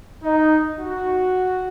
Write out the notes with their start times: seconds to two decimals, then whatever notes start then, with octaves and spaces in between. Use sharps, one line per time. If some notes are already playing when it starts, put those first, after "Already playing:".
0.23 D#4
0.80 F#4